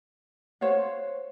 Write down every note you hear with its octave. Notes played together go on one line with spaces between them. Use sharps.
C5 C#5 F5 F#5